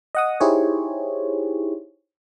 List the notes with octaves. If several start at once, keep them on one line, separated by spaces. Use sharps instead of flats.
D#5 F#5 D#6
D#4 E4 G4 G#4 C5 C#5